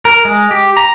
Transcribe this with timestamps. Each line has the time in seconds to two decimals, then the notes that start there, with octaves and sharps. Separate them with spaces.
0.05 A#4
0.25 G#3
0.51 G4
0.77 A#5